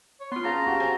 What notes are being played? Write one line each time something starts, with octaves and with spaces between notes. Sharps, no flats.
C#5
B3 F4 C6
C#3 A5 A#5
A#1 F#4 G4
C4 C5 G#5